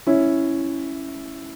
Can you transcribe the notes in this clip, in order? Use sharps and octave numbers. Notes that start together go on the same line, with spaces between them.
C#4 E4